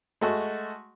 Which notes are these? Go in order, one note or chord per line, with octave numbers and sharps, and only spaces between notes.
G#3 A3 F#4